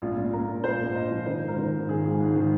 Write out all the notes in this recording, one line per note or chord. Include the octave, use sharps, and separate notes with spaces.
A#1 F4
A#1
A#1 A#4
A#2
A#1 C5
A#1
A#1 D#5
F3
D#3 C5
G#1
A#4
D#3 C5
G#2
D#3 G#4
G#1
G#2
D#3